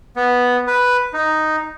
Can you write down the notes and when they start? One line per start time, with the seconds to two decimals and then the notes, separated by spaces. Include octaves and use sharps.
0.16 B3
0.67 B4
1.13 D#4